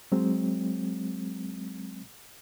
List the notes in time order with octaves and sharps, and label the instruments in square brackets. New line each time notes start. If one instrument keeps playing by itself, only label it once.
[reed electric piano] F#3 G#3 C4